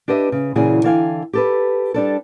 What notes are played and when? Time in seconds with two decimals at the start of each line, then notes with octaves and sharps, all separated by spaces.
0.08 D4 G4 B4 D#5 E5
0.32 C#3
0.55 A#2 C#3 E3 F#4 G#4
0.83 D3 E3 A4 F5 G5 G#5
1.33 G4 A4 B4
1.94 G3 D4 A4